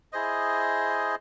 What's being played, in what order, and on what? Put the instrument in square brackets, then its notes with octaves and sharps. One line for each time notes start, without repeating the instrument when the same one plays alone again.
[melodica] E4 G#4 C5 D#5